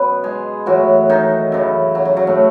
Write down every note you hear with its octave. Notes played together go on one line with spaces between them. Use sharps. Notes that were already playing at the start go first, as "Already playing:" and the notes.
Already playing: B2 F#3 B3 C#4 B4 C#5
G#3 G#4
A2 E3 F#3 F#4
D#3 D#4
F#2 C#3 E3
F#3
F#3
F#3
A2 A3